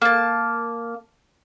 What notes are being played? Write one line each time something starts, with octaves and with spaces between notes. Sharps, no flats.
A#3 A5